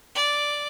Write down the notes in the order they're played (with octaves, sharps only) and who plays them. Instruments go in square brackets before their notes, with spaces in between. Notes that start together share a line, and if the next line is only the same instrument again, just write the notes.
[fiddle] D5